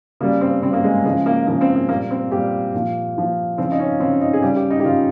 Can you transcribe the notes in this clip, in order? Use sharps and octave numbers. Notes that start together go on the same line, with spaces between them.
C#3 G3 A#3
C4
C#3 G3 C4
A#3
G#3
C#3 F3 G#3
A#3
C#3 F3 A#3
C4
A#3
A#2 G3 A#3
C4
A#2 G3 G4
A#2 F3
A#2 F3
C#3 F3 C4
D#4
C#4
C#3 F3 C4
D#4
G#4
C#3 G3 G4
G4
D#4
G4
C#3 G3 F4